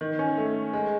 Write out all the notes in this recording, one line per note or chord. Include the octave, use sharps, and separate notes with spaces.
D#3
C#4
A3
G#3